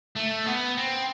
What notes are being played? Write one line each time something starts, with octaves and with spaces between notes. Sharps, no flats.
A3
B3
C4